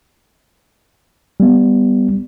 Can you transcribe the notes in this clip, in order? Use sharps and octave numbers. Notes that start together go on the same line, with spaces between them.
G3 B3